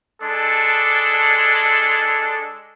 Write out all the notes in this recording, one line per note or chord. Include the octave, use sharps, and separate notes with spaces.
G#3 D4 A4